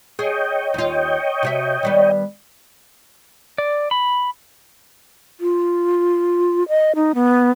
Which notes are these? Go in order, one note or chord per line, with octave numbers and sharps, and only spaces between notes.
G#4 C#5 D#5 G5
D#2 F4
C3 F#4 E5
D#3 G3 B3
D5
B5
F4
D#5
D#4
B3